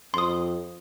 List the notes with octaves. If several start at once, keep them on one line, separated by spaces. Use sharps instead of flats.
F2 C6 D#6